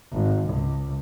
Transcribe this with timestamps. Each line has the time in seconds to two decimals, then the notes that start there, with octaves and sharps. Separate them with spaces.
0.12 G#1
0.49 C#2